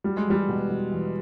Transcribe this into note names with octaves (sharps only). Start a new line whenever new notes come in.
F#3 G3
G#3
E2 G3
B2
B2
E2